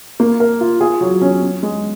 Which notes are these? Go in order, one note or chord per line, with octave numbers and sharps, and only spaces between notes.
A#3
A#4
F4
G#4
F#3
C#4
C#4
G#3